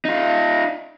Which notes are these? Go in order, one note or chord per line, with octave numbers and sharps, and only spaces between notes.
D#4 F4